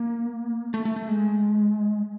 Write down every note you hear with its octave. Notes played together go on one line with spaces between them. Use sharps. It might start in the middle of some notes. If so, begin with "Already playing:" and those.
Already playing: A#3
A3
A3
A3
G#3